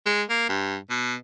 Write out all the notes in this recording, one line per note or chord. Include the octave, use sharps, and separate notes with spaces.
G#3
A#3
G2
B2